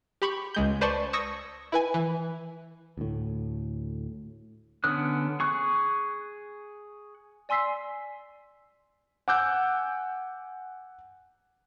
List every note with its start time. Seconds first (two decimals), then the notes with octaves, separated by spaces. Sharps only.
0.22 G4 B5 C#6
0.54 C#2 G#3 G6
0.81 B4 C5 D5 A5 C6 C#6
1.13 C#6 D#6 E6 G#6 A#6 C#7
1.72 E4 B4 G#5
1.94 E3
2.98 D2 A2
4.84 D3 B3 C#4 D#6 F#6
5.40 G#4 C#6 F#6
7.49 D5 G#5 C6 E6 B6 C7
9.28 F#5 G#5 D6 E6 F#6 G6